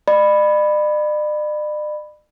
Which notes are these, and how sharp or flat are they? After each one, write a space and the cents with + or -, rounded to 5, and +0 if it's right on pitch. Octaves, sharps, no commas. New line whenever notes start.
D5 +45 B5 +5